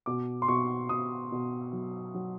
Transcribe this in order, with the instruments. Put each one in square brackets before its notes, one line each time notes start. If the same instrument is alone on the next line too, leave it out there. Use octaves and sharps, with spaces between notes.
[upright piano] B2 D6
C6
B2 C#6
B2 D#6
B2
F#3
F#3